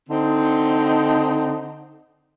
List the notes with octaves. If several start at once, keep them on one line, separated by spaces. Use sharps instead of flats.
D3 C4 D#4